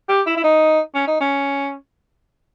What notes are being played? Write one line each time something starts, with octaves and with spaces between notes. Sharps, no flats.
G4
E4
E4
D#4
C#4
D#4
C#4